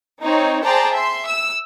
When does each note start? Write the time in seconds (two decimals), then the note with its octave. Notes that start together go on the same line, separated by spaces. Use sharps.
0.23 C4 D#4 C#5
0.63 G#4 C5 D5 G5 A5 A#5
0.94 E5 C6
1.26 E6